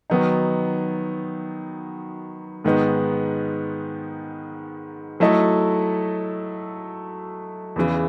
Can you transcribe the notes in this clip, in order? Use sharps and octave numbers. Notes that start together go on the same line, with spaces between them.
D#3 F#3 B3 D#4
G#2 D#3 G#3 B3 D#4
F#3 A3 E4 A4 D#5
E2 C#3 E3